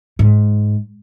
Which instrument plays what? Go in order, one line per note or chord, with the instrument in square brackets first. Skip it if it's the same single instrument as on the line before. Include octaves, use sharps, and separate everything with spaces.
[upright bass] G#2